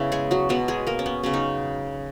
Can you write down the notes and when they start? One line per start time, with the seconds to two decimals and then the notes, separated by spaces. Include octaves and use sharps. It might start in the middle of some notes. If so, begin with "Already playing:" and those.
Already playing: C#3 B3 E4 E5
0.12 G#3 G#4
0.31 F#3 F#4
0.49 B2 F#3 G#3 B3 F#4
0.68 G#3 G#4
0.87 A#3 A#4
0.99 C#4
1.06 B3
1.23 C#3 F#3 B3 C#4
1.34 D#4